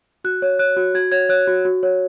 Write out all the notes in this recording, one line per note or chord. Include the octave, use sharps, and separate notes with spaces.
F#4 F#6
C#5
C#5 F#6
F#4
F#4 G#6
C#5 G#6
C#5 F#6
F#4
F#4
C#5